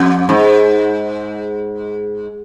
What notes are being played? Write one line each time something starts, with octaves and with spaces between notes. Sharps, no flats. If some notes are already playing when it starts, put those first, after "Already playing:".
Already playing: F2
G#2